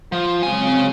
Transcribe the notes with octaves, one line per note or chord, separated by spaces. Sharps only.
F3
C#3 F#3 G#3 C4 G#5